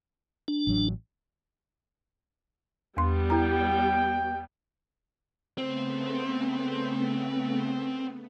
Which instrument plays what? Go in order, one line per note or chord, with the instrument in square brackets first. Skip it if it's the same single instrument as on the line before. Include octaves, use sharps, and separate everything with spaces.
[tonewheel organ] D4
[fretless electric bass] A1 F#3
[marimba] E2 C6 [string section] G3 B3
[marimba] E4 A#5 [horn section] G5
[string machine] C#3 A3 B3 [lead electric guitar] C4